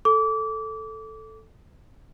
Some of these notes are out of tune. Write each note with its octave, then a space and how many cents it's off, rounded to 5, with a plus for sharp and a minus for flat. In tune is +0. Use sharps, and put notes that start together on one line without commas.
A4 +0 D6 -25